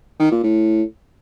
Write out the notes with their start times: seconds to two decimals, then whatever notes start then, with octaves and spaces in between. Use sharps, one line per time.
0.20 D#3
0.32 A#2
0.43 A2